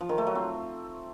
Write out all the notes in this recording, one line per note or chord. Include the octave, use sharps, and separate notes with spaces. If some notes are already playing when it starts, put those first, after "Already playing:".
F3
D#3
A3
F#3
C4